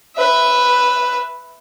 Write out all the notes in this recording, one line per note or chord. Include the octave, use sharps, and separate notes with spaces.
B4 E5